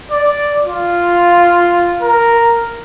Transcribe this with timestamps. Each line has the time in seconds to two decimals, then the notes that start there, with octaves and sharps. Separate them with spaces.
0.11 D5
0.64 F4
2.02 A#4